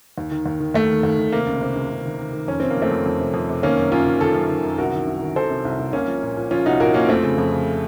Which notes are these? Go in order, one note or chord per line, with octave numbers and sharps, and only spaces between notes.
D#2
D#3
D#2
D#3
D#2 A3
D#3
D#2
D#3
C3 A#3
C#2
C3
C#2
C#2
D#3
D#3
D#3
F2 C#4
C3 C4
A#3
F2 A3 C4
F2
F2
C3
F2
C3
D#3 A#3 C#4
F#2
F#2 C#4 F4
D#3
D#3 F4 A4
F#2
D#3
F#2
C2 F#4 A#4
D#3
C2
D#3
D#3 A4 C5
C3
C2
C2
C2 A#3 C#4
F3
A#2
A#2
F3 C#4 F4
C2 D#4 F#4
A#2 F#4 A#4
F3 A#3 C#4
F2 A3 C4
C#3
F2
C#3